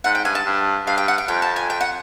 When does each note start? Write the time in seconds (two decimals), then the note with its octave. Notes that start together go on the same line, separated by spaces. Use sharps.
0.04 G#2 F#5
0.15 G5
0.24 G2 G#5
0.35 A5
0.46 G2
0.87 G2 F5
0.98 G5
1.08 F#5
1.18 G5
1.28 F2 G5
1.42 A5
1.56 G#5
1.70 G5
1.81 F#5